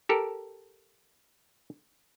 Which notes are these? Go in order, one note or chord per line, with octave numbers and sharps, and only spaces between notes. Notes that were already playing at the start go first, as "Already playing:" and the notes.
G4 A4 A#4